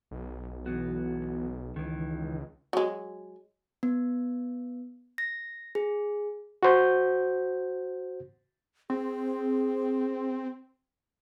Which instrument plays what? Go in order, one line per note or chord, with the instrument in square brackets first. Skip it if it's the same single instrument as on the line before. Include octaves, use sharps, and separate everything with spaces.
[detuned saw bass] B1
[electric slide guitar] E3 B3 F#4
[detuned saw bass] C#2 [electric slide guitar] D#3 E3
[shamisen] F#3 G#3
[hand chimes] B3
A#6
G#4
[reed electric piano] F#4 C5 G6
[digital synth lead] C4 [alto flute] G#4